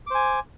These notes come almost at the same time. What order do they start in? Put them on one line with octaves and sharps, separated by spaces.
D6 C5 G#5